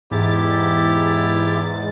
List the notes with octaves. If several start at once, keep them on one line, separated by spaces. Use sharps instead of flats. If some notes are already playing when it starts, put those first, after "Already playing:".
E2 G#2 E4 G4 A6